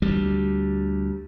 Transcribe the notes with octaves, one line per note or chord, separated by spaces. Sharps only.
D2 G3